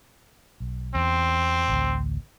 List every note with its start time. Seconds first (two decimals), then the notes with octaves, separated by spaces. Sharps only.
0.60 B1
0.95 E2 C4
1.68 A1 D2